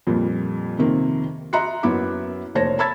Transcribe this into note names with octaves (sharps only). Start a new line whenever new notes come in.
F2 A#2 G3
F2 C3 D#3 A#3 C4
D#5 E5 A#5 C6 F#6 C#7
F#2 A#3 B3 E4 E5 D6
F1 A#3 C5 C#5 A5 A#6
A5 B5 E6 G#6 A6